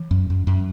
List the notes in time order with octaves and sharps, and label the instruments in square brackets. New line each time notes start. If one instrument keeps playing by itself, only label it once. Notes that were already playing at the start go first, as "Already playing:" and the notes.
Already playing: [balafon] E3
[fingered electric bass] F#2
F#2
F#2